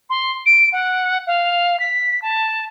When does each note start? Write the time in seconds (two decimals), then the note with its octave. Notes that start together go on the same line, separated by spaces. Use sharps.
0.09 C6
0.45 D7
0.72 F#5
1.26 F5
1.79 B6
2.22 A5